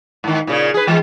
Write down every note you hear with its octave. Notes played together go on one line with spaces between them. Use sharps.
G#2 D#3
A#2 C#3
G#4 B4
E3 G#3